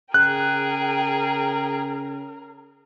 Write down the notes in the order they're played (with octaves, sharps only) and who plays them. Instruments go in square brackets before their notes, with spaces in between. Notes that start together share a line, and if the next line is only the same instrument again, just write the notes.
[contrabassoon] C#3 [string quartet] G#4 G5 [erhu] A#4 [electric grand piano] F#6